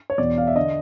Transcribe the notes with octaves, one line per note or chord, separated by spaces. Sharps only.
C#5
E2 B2 D5
F5
E5
D3 D#5